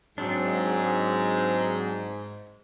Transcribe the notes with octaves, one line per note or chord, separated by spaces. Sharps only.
G#2 F#3 C4 D4